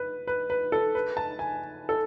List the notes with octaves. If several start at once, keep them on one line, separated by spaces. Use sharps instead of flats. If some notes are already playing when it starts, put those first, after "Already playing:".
Already playing: B4
B4
B4
A4
B4
A5
G#5
A4